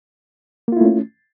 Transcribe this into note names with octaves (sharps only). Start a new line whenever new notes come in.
A3 A#3 C#4 E4 F4